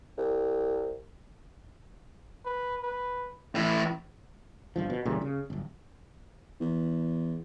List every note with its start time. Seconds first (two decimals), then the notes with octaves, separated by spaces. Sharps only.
0.18 C2
2.45 B4
2.83 B4
3.55 A2 E3 E4
4.76 G1 G2 F3
4.90 B2
5.05 A#2 C#3 E3 G3
5.21 C#3
5.50 D1 G1
6.60 E2